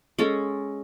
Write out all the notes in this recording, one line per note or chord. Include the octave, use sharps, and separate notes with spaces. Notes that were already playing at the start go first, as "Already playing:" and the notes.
G#3 C#4 A4